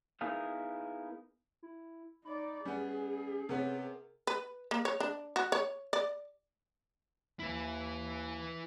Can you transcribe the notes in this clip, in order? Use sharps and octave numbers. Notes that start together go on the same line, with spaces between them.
B3 D#4 E4 G#4 A#4 F5
E4
D#4 D5 B5
G3 B3 C#4 G#4
C3 B3 C#4 A#4
B4
A#3
C#5
D4
F#4
C#5
D5
D#2 E4 B4